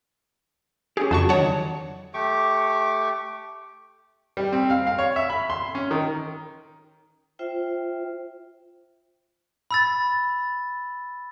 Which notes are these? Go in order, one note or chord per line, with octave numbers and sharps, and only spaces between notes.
C#4 G4 G#4
F2 C#3 E3 F#4 A5 C#6
D3 D#3 F#3 C#5 F#5 A5
A3 G4 C#6 D6
G3
C4
F5
F5
C#5
E5
B5
C6
C#4
D#3
F4 C5 E5 G5
B5 E6 A6